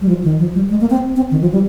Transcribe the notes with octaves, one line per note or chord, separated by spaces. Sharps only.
G3
F3
D#3
F3
G3
G#3
A#3
C4
C4
D#3
F3
G3